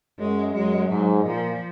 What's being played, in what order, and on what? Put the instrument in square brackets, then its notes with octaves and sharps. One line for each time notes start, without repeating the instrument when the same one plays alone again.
[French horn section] F#2 [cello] G#3
[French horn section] F#2 [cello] G#3
[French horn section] G#2 [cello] F#3
[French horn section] A#2 [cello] F3